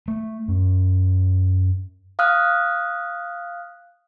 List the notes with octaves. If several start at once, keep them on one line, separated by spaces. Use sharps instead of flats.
A3
F#2
F5 D#6 F6 F#6